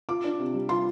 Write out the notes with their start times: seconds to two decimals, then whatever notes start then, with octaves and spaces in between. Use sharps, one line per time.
0.09 F4 D6
0.24 D4
0.39 C3
0.54 G3
0.69 F4 C6